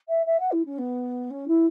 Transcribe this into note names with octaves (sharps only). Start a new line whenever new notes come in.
E5
E5
F#5
E4
C#4
B3
C#4
E4